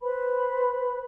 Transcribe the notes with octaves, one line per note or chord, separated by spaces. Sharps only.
B4 C5 B5